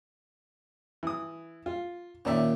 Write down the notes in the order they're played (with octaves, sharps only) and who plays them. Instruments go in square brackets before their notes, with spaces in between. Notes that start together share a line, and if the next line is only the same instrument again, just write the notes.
[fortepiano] E3 D#6
F4
[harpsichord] A#2 D#3 [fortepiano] C#4 D5 E5